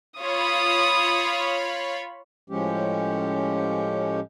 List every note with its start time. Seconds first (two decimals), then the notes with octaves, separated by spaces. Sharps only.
0.20 F4 C#5 B5 D#6
2.50 A2 F3 G#3 C#4 G4